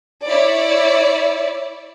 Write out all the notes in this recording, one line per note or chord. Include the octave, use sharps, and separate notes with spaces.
E4 C#5 D5